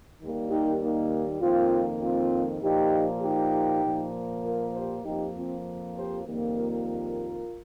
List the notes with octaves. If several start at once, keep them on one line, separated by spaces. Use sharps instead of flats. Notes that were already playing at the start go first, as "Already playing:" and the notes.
D#2 D#3 G3 A#3
D#4 G4
A#3 D#4
F2 D#3 A#3 C4 F4
C4 F4
A#2 F3 A#3 D#4 G4
D#4 G4
A#2 F3 A#3
F4 A#4
G4 C5
F2 F3 A#3 D#4 G4
C4 F4
G4 C5
F2 D#3 G3 A#3
F4 A#4